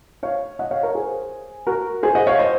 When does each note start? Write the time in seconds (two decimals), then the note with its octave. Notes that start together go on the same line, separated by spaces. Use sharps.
0.23 C#5 F5
0.59 D#5 F#5
0.71 C#5 F5
0.83 A#4 C#5
0.95 G#4 C5
1.67 F#4 A#4
2.03 G#4 C5
2.15 D#5 F#5
2.27 C#5 F5
2.39 C5 D#5